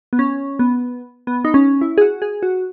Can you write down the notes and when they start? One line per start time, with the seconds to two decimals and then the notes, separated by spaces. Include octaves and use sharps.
0.13 B3
0.19 C#4
0.59 B3
1.27 B3
1.45 D#4
1.54 C#4
1.81 E4
1.98 G#4
2.01 F#4
2.22 G#4
2.43 F#4